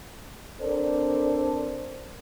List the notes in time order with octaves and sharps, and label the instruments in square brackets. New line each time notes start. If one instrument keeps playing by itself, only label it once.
[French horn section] C4 D4 A4 A#4 C5 D5